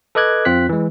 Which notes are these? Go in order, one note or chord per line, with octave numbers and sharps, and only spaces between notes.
A4 B4 D#5 D6 F#6 G#6
F2 C4 F4 F#6 B6
E3 G#3